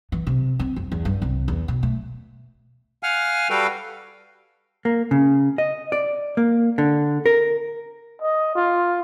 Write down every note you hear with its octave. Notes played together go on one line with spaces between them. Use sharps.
E3
C3
C4
F2
E2
G2
C2
E2
B2
A3
F5 F#5 G#5 F6
G3 F#4 A4 B4 F5 G5
A#3
C#3
D#5
D5
A#3
D3
A#4
D#5
F4